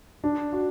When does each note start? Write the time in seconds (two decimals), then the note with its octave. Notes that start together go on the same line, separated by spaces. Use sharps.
0.24 D4
0.53 F#4